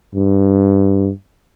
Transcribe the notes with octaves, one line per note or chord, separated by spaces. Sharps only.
G2